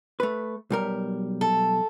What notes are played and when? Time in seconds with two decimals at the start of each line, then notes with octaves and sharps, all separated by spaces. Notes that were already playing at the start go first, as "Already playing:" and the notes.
0.20 A3 B4
0.70 B1 G3 A#4
1.41 A4